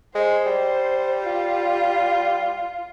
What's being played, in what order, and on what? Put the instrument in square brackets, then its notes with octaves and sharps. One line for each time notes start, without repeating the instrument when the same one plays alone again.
[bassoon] G#3 [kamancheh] C5
[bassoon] G3
[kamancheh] F4